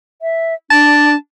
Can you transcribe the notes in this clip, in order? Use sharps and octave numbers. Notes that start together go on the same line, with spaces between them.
E5
D4 A5